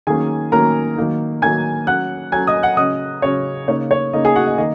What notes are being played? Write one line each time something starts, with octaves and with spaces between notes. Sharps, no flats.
D#3 F#3 A#3 C#4 G#4 G#5
D#3 F#3 A#3 C#4 A#4 A#5
D#3 F#3 A#3 D#4
D#3 F#3 A#3 D#4 G#5 G#6
F#3 C#4 F#5 F#6
F#3 C#4 G#5 G#6
D#5 D#6
F#5 F#6
C#3 F#3 C#4 D#5 D#6
C#3 F#3 C#4 C#5
C#3 A#3 D#4 C#5
C#5
C#3 A#3 D#4 D#5
G#4 G#5
F#4 F#5
D#5
D#3 A#3 D#5